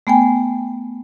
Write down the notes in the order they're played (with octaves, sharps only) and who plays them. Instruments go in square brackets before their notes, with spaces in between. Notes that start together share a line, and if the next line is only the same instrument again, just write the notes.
[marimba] A3 B3 G5 G#5